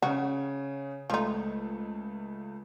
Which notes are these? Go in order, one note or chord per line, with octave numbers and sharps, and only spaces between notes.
C#3 F#4
C#2 F3 A3 D#4